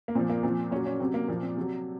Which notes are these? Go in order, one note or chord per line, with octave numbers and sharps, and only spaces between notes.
A#3
A#2 F3 C4
A#3
A#2 F3 C4
A#2 F#3 C#4
C#4
C3 F#3 C4
A#3
A#2 F3 A#3
C4
C3 F#3